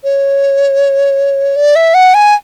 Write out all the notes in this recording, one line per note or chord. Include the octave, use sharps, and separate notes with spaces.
C#5
D5
E5
F#5
G#5